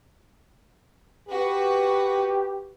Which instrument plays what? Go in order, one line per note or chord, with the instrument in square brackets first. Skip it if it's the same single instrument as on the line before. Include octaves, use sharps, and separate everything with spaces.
[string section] F#4 B4 [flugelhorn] G4